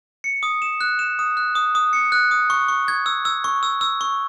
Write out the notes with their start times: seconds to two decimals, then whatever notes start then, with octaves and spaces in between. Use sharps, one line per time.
0.24 C#7
0.43 D#6
0.62 E7
0.81 F#6
0.99 E7
1.19 D#6
1.37 F#6
1.55 D#6
1.75 D#6
1.93 C#7
2.12 F#6
2.31 D#6
2.50 C#6
2.68 C#6
2.88 G#6
3.06 E6
3.25 E6
3.44 C#6
3.63 E6
3.81 E6
4.01 C#6